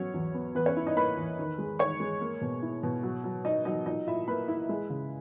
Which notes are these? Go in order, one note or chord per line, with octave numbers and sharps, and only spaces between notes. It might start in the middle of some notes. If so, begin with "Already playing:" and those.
Already playing: F#3 B3 C#4 C#5
E2
B3
E2 B3 B4
C#4 C#5
E4
D#4 D#5
A#3 B4 B5
E2
D#3
G#3
D#3 C#5 C#6
G#3
A#3
B2
E4
B2
F#3
F#3
F#3 D#4 D#5
F#3 D#4 D#5
A#2 D#4 D#5
A#2 E4 E5
A#3 B4 B5
E4
G#3
C#3